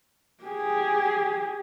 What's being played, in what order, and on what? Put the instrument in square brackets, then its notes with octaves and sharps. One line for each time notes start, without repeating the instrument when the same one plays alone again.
[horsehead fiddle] G4 G#4